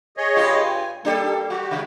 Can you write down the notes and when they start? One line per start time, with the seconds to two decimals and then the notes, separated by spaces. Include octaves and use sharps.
0.17 G#4 C#5 D#5
0.36 G2 F4 G4
0.62 G#5
1.05 G3 A#3 D4 G4 A4
1.50 G3 F#4 G4
1.71 C#3 G#3